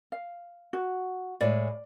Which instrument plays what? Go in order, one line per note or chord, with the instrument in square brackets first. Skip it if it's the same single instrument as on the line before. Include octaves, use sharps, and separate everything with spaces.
[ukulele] F5
F#4
[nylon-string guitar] A2 G#3 [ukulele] D5